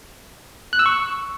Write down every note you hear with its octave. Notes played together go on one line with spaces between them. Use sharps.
F#6
E6
C#6